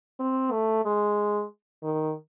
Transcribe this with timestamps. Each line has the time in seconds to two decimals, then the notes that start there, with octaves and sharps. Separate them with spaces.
0.20 C4
0.52 A3
0.85 G#3
1.83 D#3